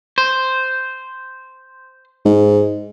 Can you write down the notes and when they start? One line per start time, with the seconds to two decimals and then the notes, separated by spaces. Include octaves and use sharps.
0.18 C5
2.26 G#2